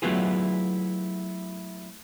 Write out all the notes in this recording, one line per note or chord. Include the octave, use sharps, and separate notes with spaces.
F#3 A3 B3 E4 F4 G#4